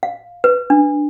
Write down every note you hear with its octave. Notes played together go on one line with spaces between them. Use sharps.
F5
B4
D4